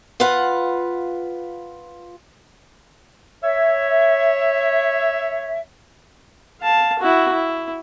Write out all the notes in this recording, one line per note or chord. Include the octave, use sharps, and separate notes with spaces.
F4 B4 F5 F#5
C#5 E5
F5 A5
E4 F#4
E4